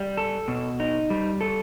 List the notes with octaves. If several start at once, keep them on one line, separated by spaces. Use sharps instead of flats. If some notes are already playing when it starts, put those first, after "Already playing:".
Already playing: G3
A4
B2
D#4
G3
A4